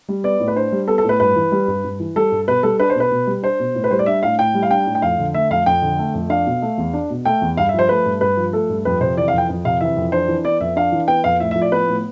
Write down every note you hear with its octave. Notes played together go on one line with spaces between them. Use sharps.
G3
B3 D5
A2
B4
D4 C5
G3
B3 A4
A4
A2
B4
G2 B4
E3
G3
G2
G2
E3
G3 A4
G2
B2 B4
G3 A4
D4 B4
C5
B2 B4
B2
G3
D4 C5
B2
A2
B4
G3 C5
D5
D4 E5
A2 F5
A2 G5
G3
F5
D4 G5
A2
G5
F2 F5
D3
A3 E5
F2 F5
F2 G5
D3
A3
F2
D4 F5
B2
A3
E2
D4
B2
A3 G5
E2
G2 F5
E5
F3 C5
A3 B4
G2
G2 B4
F3
A3 A4
G2
F2 B4
C3 C5
E3 D5
F5
F2 G5
F2
C3 F5
E3 E5
F2
D4 C5
E3
B3 D5
F2 E5
D4 F5
E3
B3 G5
F2 F5
A2 E5
E5
F3
D5
B3 B4
A2